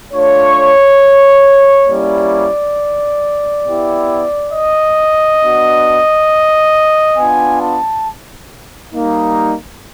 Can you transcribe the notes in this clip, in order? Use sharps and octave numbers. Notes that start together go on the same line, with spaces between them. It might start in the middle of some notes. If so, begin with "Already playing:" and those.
A3 D4 F4 C#5
G3 A#3 C#4 E4 G4 D5
B3 E4 G4
D#5
B3 D4 F#4
B3 D4 F4 G#5
A5
G3 A#3 D#4